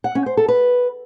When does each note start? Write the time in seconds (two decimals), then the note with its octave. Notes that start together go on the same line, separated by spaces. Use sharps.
0.04 F#5
0.15 C#4
0.26 C5
0.37 A4
0.48 B4